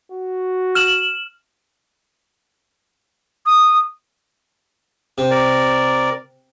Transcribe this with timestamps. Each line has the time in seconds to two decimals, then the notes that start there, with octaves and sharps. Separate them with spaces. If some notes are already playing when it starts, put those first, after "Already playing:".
0.12 F#4
0.75 F6 E7 F#7
3.46 D#6
5.18 C3
5.30 A#4 D5